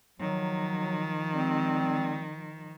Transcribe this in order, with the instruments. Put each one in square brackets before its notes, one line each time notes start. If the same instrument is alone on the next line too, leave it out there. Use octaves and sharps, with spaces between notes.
[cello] D#3 F3 [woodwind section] F#3
[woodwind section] G3 G#3 C4